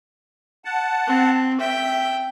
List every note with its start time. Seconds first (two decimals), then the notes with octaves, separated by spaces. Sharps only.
0.65 F#5 A5
1.07 C4
1.60 E5 G5